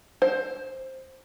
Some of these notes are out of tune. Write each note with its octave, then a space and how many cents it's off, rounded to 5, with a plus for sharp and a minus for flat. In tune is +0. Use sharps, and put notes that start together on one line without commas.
C5 +10